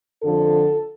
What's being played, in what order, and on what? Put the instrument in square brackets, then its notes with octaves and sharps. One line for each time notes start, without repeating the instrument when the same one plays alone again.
[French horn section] F2 D3 F3 A4